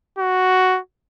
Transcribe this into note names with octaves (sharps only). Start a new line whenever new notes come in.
F#4